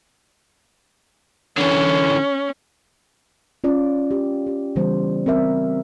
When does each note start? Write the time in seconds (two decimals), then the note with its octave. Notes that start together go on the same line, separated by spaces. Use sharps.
1.58 D3 E3 C#4
3.64 C#4 F4 D5
4.11 G4
4.47 G4
4.76 C#3 E3 G3 B3 C5
5.26 C4 A#4 E5